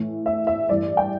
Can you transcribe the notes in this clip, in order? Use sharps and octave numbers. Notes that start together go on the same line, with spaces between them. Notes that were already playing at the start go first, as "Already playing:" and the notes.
Already playing: A2 E3
E5
E5
G2 E3 D5
G5